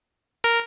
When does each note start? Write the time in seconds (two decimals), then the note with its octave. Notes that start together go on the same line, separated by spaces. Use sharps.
0.44 A#4